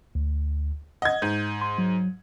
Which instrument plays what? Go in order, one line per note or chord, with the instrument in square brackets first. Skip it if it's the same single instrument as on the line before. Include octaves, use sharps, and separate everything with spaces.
[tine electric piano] D2
[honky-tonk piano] D#5 G#6 [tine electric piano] F#5
[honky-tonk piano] G#2 [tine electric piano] G6
[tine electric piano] C6
F#3